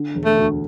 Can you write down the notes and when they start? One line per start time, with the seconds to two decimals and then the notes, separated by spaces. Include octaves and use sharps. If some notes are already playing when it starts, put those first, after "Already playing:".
Already playing: D3
0.15 E1
0.25 A3
0.37 D2